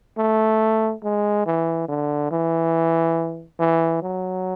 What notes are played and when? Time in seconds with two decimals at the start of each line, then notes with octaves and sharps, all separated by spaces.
0.17 A3
1.03 G#3
1.46 E3
1.88 D3
2.31 E3
3.59 E3
4.02 F#3